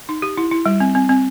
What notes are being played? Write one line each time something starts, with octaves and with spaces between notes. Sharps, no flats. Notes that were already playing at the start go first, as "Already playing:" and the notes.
D#4
G4
E4
E4
G3
C4
C4
C4